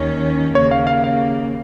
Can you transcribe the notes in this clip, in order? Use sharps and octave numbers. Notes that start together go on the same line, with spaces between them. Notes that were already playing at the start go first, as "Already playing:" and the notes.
Already playing: D#2 D#3 C#4
D#2 C#3 A#3 C#5
F5
F5
F5